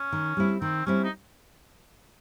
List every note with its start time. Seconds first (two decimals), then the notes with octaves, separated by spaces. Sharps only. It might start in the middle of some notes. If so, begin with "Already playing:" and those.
Already playing: C#4
0.12 D#3
0.37 G3 C4 E4
0.61 D#3 C4
0.86 G3 C4 C#4 E4
1.04 D#4